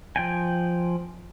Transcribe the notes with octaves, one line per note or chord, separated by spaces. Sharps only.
F3 G5 G#5